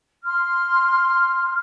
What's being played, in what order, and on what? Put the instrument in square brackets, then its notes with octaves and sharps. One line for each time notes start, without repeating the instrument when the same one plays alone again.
[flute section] C6 F6